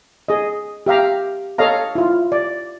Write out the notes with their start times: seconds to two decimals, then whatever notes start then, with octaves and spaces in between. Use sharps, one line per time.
0.28 G#4 D#5
0.86 G4 E5 F5 A#5
1.58 A4 C#5 D#5 F5 A#5
1.95 E4 F4
2.32 D5